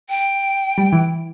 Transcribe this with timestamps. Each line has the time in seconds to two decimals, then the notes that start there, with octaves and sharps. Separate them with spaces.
0.09 G5
0.78 G3
0.93 E3